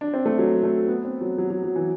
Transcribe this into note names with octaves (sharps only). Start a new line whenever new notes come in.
D4
C4
A3
F#3
A3
B3
C4
F#3
F#3
F#3
F#3
E3